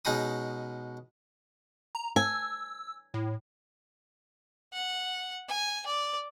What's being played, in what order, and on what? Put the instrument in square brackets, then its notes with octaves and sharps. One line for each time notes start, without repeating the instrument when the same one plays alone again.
[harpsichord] B2 G#3 C#4 D#4 B5 D#6
[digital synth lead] A#5
[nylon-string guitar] G#5 [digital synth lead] E6
[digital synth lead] A2
[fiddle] F#5
G#5
D5